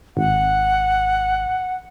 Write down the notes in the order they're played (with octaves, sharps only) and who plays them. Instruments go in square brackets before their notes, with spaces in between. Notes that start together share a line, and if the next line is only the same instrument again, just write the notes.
[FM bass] G#1 [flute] F#5